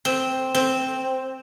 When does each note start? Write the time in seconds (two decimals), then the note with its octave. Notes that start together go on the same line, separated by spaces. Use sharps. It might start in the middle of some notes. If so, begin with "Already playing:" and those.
0.05 C4
0.55 C4